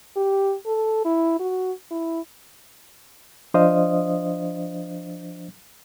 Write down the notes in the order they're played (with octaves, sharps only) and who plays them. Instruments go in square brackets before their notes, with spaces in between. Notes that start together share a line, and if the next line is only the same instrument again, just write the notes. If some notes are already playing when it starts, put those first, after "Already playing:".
[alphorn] G4
A4
E4
F#4
E4
[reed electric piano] F3 D4 C5 D#5 F5 D#6